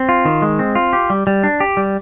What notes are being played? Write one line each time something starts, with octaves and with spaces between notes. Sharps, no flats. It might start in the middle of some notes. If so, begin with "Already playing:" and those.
Already playing: C4
F4
D#3
G#3
C4
F4
G4
G3
G3
D4
G4
G3